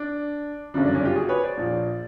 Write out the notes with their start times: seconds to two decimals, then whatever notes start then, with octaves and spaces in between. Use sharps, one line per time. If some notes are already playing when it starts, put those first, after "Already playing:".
Already playing: D4
0.74 G1 F#2 C#3 D4
0.85 D4
0.95 C#4
1.05 F4 G4
1.16 F#4 G#4
1.29 B4 C#5
1.43 C5 D5
1.57 A#1 A#2 F3